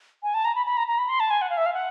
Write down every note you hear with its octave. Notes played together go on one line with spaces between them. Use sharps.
G#5
A5
A#5
B5
B5
A#5
A#5
B5
C6
A5
G#5
F#5
F5
E5
F5
F#5